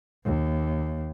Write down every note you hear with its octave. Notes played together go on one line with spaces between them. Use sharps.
D#2